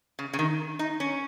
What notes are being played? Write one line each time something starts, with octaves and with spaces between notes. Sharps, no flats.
C#3
C#3
D#3
D#4
C#4